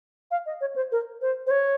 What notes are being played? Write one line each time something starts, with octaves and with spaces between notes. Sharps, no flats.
F5
D#5
C#5
C5
A#4
C5
C5
C#5